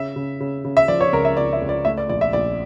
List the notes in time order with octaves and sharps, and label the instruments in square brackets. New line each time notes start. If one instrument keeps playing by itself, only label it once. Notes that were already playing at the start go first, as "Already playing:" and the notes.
Already playing: [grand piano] C#3 E5
C#3
C#3
C#3
E5
F3 D5
C#5
C#2 A#4
E5
C#2 D5
E5
C#2
D5
A3 E5
D5
A#1 D5
E5
A#1 D5